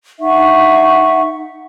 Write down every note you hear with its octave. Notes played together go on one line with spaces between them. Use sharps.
D#4 E5 F#5 C#6